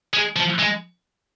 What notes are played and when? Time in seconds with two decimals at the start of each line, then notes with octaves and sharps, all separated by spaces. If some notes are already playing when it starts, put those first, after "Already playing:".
0.14 G#3
0.36 F3
0.59 G#3